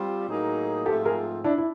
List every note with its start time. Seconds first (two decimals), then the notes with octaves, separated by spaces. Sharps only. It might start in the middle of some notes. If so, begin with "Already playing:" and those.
Already playing: G3 C4 F4
0.27 A2 F#3 A#3 D#4 G#4
0.85 G#2 F3 A3 C4 F4 G4 A4
1.05 G#4 A#4
1.44 D4 E4
1.58 E4